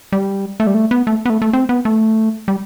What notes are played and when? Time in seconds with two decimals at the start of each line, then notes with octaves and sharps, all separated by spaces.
0.12 G3
0.60 A3
0.67 G3
0.74 A3
0.91 B3
1.07 A3
1.25 B3
1.30 A3
1.42 A3
1.53 C4
1.69 B3
1.85 A3
2.48 G3